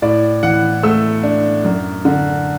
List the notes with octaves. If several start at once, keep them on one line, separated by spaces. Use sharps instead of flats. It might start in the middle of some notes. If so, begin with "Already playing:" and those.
A2 D5
E3 F#5
A3 E6
D4
F#2
D3